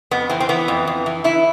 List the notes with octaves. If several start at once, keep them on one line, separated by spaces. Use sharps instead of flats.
F2 B3
E3 C4
C4
E3 B3
F2
F2
E3
E3 E4